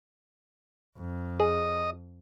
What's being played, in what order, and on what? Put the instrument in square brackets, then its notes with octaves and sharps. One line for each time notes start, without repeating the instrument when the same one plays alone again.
[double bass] F2
[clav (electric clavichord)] G#4 [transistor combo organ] D#5